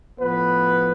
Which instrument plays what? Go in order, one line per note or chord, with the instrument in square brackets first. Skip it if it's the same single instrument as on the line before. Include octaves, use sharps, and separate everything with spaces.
[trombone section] A2 F3 B3 B4